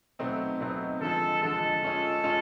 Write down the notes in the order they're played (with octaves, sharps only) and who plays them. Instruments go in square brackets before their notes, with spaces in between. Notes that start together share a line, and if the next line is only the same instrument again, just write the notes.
[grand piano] B2 F#3 A3 C4 D#4
B2 F#3 A3 C4 D#4
[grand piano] D3 F3 G#3 [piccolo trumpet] A4
[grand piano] D3 F3 G#3 [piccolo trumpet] A4
[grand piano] G#3 C#4 F4
G#3 C#4 F4